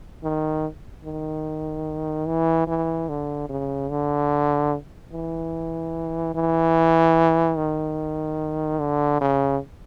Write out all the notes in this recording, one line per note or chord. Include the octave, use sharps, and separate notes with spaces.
D#3
D#3
E3
E3
D3
C#3
D3
E3
E3
D#3
D3
C#3